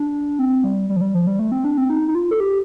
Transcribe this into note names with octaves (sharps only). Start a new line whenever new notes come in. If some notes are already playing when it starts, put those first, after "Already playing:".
Already playing: D4
C4
G3
G3
F3
G3
F3
G3
A3
C4
D4
C4
D#4
D#4
F4
A4
G4